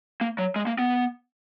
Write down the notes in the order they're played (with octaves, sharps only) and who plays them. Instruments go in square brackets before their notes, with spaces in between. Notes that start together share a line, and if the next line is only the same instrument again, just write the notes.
[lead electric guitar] A#3
F#3
G#3
A#3
B3